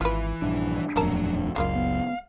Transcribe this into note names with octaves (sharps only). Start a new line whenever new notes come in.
G#1 E3 E4 F4 B4
A#1 G2 D4
D#1 F2 A2 F#3 G3 A#4 A5
F#1 C#2 F#2 C#3 A#3 F4 F5
B3